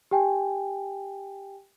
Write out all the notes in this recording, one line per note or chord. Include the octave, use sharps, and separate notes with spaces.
G4 G5 G#5